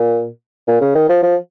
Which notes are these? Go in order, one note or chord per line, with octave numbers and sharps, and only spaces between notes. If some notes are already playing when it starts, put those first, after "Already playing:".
Already playing: A#2
A#2
C#3
D#3
F3
F3